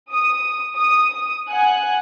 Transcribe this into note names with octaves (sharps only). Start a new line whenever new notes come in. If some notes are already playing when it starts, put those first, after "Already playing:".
D#6
D#6
F#5 G#5 F#6